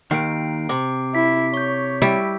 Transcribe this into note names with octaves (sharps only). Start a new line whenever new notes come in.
D#2 D#3 C7 D7
C3 D6
E4 B6
C#5 C#6 G6
G3 E4